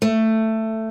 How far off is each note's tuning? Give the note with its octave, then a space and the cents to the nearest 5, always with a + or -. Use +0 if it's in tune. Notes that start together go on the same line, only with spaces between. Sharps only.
A3 +10